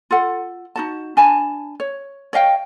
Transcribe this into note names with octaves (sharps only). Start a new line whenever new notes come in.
F4 A4 F#5
D#4 F#4 A5
D4 G#5 A5 B5
C#5
C#5 D#5 F5 G5